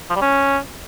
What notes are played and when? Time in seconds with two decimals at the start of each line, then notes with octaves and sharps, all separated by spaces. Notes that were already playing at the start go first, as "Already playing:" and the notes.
0.10 F3
0.16 G3
0.22 C#4